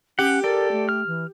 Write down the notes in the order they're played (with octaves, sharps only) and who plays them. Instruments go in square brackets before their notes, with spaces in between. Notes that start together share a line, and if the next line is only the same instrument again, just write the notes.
[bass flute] C#4 [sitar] G4 [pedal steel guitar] F#5
[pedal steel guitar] A4 D5 [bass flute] A#4
[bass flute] A3
[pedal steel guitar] F6
[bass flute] E3